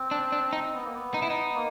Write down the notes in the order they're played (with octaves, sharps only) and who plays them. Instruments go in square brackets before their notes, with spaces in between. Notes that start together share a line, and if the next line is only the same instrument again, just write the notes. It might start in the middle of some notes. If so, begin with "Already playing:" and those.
Already playing: [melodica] C4
[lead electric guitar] D4
D4
D#4
[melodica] B3
A#3
B3
[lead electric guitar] D#4
E4
D#4
[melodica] A#3